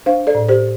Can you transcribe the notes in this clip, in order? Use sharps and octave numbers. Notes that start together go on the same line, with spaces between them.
D4 C5 F5
A4 D5
A2
G4 C5